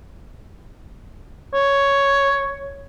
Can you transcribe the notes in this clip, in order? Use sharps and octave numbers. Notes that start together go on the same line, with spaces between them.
C#5